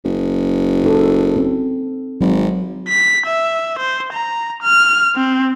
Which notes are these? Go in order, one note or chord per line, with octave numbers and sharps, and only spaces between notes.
F#1
D#4 A4
C4
G#1 F#3
B6
E5
C5
A#5
F6
C4